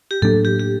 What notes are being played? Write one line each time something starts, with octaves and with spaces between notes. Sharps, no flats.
G4
A2 F#3 A#3 D4 A4
G4
G4